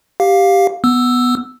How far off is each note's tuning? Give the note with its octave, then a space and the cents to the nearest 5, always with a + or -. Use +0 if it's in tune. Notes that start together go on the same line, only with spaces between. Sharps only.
G4 +0 F5 +10
B3 +0 E6 +0